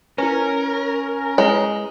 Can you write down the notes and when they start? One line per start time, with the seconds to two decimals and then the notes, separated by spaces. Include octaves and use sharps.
0.18 C#4 E4 A#4 B4
1.38 G#3 E4 B4 C#5